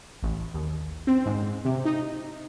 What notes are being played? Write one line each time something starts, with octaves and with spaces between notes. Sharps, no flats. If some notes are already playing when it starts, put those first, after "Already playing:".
A1
D#2
C4
G#2
C3
D#4